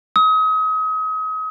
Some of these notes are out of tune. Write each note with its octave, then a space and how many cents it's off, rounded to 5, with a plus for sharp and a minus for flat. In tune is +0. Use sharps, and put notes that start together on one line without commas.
D#6 +35